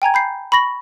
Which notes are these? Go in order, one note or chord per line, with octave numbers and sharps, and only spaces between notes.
G5 G#5 A#5 G#6
B5 G6 C7
B5 C#6 A#6 F#7